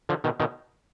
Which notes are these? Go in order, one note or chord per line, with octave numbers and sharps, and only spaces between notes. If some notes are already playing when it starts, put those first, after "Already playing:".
D3 F3
B2 D#3
B2 D#3